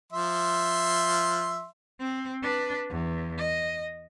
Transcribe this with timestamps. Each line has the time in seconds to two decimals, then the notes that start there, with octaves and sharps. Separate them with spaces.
0.13 F3 E5 C6
2.00 C4
2.42 D4 B4
2.90 E2
3.38 D#5